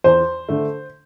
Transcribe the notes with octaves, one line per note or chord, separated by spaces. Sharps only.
E2 C5
D3 A3